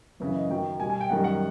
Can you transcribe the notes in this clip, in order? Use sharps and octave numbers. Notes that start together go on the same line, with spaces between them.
F#2 C#3 E3 B4
D#5
F#2 D#3 F#3 G5
B2 G3 G#5
G#5
G5
F#2 D#3 G3 F#5
F#5